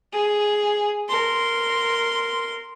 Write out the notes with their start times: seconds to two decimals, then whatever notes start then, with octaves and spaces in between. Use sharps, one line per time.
0.13 G#4
1.09 A#4 C6